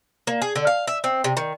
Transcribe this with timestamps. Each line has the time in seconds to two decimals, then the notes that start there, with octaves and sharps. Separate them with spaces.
0.27 A#3
0.42 G#4
0.56 D3
0.67 F5
0.87 E5
1.04 C4
1.24 C3
1.37 D#3